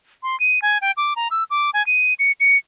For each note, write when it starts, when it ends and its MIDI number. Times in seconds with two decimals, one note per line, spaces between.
0.23 0.38 84
0.40 0.62 99
0.62 0.78 80
0.81 0.91 79
0.97 1.13 86
1.16 1.28 82
1.31 1.44 88
1.50 1.70 86
1.74 1.85 80
1.86 2.14 99
2.19 2.32 97
2.40 2.57 97